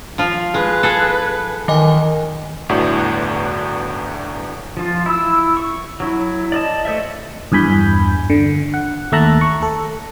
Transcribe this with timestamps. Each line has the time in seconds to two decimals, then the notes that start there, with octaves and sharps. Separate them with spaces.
0.18 F3 F4
0.54 G#3 B4
0.83 G#4 A4
1.68 D#3 E3 D#5 G#5
2.69 G1 E2 A2 D4 F#4
4.77 F3 F4
5.06 E4 E6
5.57 C#6
6.00 F#3 E4
6.52 D5 D#5 A5
6.85 A3 C5 D5 E5
7.52 E2 G2 G#5 B5 G6
8.30 D3
8.74 F#5
9.12 D#2 A3 E5 A5 A#5 F#6
9.41 C#6
9.62 A4